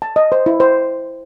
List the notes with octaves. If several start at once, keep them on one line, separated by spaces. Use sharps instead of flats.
A5
D#5
C5
E4
C5